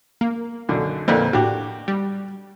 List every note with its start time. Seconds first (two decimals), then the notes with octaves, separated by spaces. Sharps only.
0.21 A#3
0.69 B1 F#2 D3
1.08 F2 A#2 D3 C4 A#4 B4
1.33 A2 D4 F#4 G4
1.88 G3